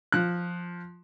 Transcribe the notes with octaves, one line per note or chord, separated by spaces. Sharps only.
F3 F#6